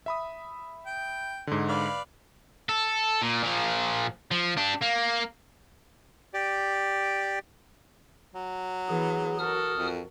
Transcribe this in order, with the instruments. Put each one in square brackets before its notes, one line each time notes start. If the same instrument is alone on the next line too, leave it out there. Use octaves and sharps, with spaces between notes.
[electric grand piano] E5 B5 D#6
[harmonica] G5
[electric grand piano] G#2 D3
[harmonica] B4 D5 F5
[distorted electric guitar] A4
A#2
A#2 F3
F3
D4 G4
A#3
[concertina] G4 D5
[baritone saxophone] F#3
[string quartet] E3 B3 [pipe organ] G#4
[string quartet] F#4 A4 A#4 [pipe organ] D#6 F6
[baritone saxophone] F2